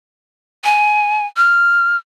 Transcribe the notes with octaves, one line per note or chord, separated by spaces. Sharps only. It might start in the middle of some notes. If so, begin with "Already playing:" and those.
G#5
F6